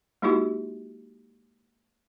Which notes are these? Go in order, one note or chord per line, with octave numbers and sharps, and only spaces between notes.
G#3 A#3 D#4 E4 F#4 G4